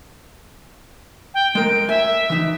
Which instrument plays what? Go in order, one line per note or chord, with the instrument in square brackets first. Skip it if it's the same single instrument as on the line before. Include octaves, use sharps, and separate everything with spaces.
[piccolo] G5
[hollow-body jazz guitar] G#3 A#4 [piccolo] D7
[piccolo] E5 [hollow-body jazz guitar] G#5
[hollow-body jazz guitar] E3 D#4